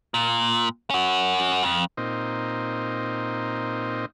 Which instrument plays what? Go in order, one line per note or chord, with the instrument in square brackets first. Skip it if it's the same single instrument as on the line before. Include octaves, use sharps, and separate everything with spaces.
[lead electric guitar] A#2
C#4 F#4
F2
[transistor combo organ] A#2 C4 D#4